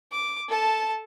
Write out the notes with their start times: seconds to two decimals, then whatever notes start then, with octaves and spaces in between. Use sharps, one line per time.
0.12 D6
0.48 A4 A5